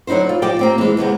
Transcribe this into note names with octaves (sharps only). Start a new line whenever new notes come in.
D3 F#3 D#4 E4 C5
F4
F3 G3 D5 D#5 G5
A#3 C4 G4
E3 G#3
D#2 C3 G#3 B3